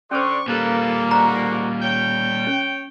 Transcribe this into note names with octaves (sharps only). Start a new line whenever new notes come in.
D3 C#4 C5 D5 C6 C#6
A#2 G3 A#3 A4 B4
G#2 D3 F#4 A#5
C#5 G5
C#4